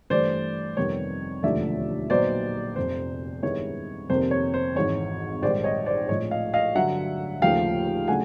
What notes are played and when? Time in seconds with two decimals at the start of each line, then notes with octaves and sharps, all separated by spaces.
0.10 G2 E3 A3 C5 D5
0.77 F2 C3 D#3 G3 B3 C#5
1.43 E1 D#2 D3 F3 A3 D5 E5
2.10 A#1 A#2 F#3 B3 D#4 C5 D5
2.76 F1 F2 C3 C5
3.42 G2 D#3 G#3 B3 E4 C#5
4.09 F2 C3 D#3 G3 A#3 C5
4.31 C#5
4.54 C5
4.75 G#1 G#2 E3 C#5
5.42 A#1 G#2 D#3 G3 C5 D5
5.64 C#5 D#5
5.86 C5 D5
6.08 A#1 A2 F3 C#5 D#5
6.31 D#5 F5
6.53 D#5 F5
6.75 G2 D3 F#3 E5 F#5
7.42 D#2 C#3 F3 A3 F5 G5
8.08 C#3 F#3 A3 D4 F#5 G#5